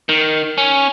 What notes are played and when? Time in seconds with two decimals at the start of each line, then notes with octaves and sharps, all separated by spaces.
0.09 D#3
0.58 C#4